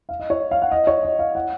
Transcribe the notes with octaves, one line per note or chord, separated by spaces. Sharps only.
F5
D#5
C#5
F5
F#5
D#5
C#5
D#5
F5
F#5